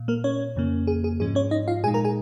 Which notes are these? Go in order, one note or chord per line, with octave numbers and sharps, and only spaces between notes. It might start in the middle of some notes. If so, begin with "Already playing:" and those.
Already playing: A#2
A#3 A#4
C#4 C#5
F2 C#3 A#3 C#4
G#4
G#4
G#2 F3 C#4 G#4
C#4 C#5
D#4 D#5
F4 F5
A#2 G#3 D#4 G#4 G#5
A#4 A#5
G#4 G#5